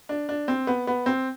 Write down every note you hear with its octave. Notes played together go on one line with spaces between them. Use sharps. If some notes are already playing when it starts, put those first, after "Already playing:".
D4
D4
C4
B3
B3
C4